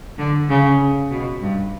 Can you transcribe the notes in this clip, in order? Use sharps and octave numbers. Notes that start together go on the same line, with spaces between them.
D3
C#3
B2
G2